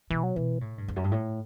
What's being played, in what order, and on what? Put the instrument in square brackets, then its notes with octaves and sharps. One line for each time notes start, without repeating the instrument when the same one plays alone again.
[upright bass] B2 [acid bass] E3
[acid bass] F#3
[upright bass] B2 [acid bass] E3
[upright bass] A2
G2
E2
F#2
G2
A2